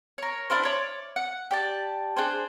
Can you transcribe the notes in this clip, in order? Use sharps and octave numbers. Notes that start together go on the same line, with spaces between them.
A#4 C#5
D4 E4 A#4 C5
C#5 D5
F#5
G4 D5 A5
D4 G#4 C5